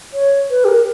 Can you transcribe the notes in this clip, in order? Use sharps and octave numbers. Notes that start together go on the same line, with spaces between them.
C#5
B4
G4
A#4